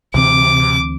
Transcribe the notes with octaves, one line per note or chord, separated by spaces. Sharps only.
D2 C3 E3 C4 D6